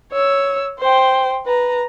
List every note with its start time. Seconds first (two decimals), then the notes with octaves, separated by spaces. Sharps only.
0.13 C#5 E6
0.79 C5 G5
1.46 B4 A#5